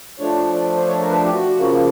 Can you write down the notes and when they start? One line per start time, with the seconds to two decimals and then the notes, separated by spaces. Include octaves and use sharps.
0.19 F3 A3 D4 C#5
0.54 D5
0.76 C5
0.88 C#5
1.01 A#4
1.11 B4
1.25 G4
1.34 F#4
1.57 C#3 F3 A#3